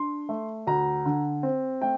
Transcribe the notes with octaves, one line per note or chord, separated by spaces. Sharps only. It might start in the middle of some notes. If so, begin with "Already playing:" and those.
Already playing: D4 C6
A3
D2 A#5
D3
C4
A3 G5